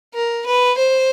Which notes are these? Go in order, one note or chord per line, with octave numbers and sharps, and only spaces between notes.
A#4
B4
C5